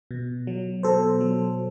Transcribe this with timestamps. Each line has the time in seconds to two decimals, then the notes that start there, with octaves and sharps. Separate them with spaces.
0.11 B2
0.47 F#3
0.83 B2 A4 C5
1.21 F#3